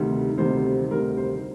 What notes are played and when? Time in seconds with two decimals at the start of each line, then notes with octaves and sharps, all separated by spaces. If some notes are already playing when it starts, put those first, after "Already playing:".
Already playing: D2 C3 D#3 G3
0.37 D2 C3 D#3 G3 C5
0.91 D2 C3 D#3 G3 A#4
1.17 C5